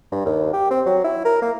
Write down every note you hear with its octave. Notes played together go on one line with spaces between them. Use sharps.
G2
D#2
G4
C4
F#3
E4
A#4
A#3